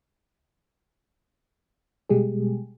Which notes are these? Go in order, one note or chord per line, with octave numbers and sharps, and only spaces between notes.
B2 G3 G#3 G4 G#4